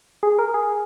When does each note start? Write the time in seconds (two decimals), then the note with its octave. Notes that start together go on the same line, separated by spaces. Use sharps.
0.23 G#4
0.39 A#4
0.54 G#4